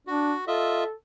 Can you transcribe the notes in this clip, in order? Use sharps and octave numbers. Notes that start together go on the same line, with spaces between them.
D4 F#4
F4 A4 D#5 E5